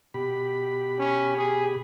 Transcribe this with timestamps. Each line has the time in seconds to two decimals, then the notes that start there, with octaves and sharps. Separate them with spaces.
0.14 B2 G4 B5
0.99 C#4
1.37 G#4